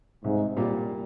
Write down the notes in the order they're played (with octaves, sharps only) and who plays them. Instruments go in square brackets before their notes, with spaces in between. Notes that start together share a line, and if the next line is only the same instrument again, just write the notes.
[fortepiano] C2 [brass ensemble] G#2
[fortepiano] A#2 G3 A#3 F4